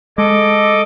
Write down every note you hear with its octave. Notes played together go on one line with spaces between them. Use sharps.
G#3 A4 D#5 D6